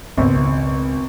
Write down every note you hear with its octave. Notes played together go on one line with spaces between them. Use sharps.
G#1 C#2 B2 C4